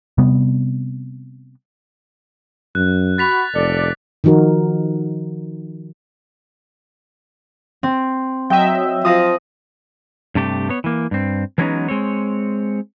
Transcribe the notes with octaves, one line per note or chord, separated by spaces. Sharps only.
C3 G3 B3
F#2 F#6
F#4 B5 A6 B6 F7
F1 A4 D5
D#3 F3 D#4 F#4 A#4
C4
F#3 D#5 E5 G5
F3 D#6 A#6 D#7
G2 C3 A3 G4
B3 C#5
E3 A#3
G2 C4
E3 F#3 G#3 B3 C#4 D#4
G#3 C4 C#5